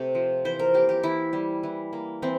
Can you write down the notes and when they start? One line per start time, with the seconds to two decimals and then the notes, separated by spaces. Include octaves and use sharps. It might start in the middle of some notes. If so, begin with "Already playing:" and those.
Already playing: C3 A3
0.15 F3
0.45 E3 C5
0.59 A#4
0.74 A#3 G4
0.89 G4
1.03 E3 E4
1.33 G3
1.63 E3
1.93 A#3
2.22 E3 C4